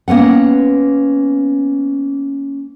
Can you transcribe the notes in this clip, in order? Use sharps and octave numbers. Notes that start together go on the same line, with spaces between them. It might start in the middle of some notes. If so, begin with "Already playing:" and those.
A#3 B3 C#4 F#5